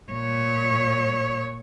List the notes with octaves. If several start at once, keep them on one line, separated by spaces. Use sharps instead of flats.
A#2 C#5